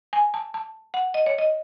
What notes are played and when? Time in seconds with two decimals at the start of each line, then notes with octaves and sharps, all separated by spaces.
0.13 G#5
0.34 A5
0.54 A5
0.94 F#5
1.14 D#5
1.26 C#5
1.39 D#5